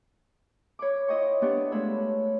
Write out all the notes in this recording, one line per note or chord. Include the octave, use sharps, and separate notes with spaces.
C#5 B5 D6
E4 F4 D#5 G5 C#6
B3 D4 G4 C#6
G#3 A3 F4 C#5 B5 E6